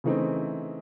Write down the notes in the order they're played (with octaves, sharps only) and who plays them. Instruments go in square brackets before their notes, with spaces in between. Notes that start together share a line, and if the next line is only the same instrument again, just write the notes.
[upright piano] C#3 E3 A3 C4 D#4